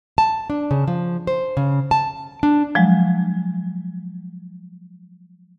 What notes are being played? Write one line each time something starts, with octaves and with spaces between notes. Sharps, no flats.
A5
D4
C#3
F3
C5
C#3
A5
D4
F3 F#3 G#3